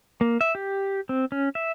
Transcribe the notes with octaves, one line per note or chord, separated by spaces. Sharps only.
A#3
E5
G4
C4
C#4
E5